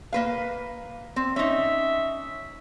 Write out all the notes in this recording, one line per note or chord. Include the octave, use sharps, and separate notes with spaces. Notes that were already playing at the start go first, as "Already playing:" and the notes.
A#3 B4 F5
C4
C#4 D#4 E5